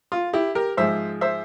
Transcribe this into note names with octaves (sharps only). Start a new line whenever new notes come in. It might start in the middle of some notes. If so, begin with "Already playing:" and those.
F4
E4 G4
G4 A#4
G#2 F3 G#3 C5 E5
C5 E5